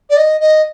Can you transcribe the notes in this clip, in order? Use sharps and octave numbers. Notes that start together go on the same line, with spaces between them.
D5
D#5
D#5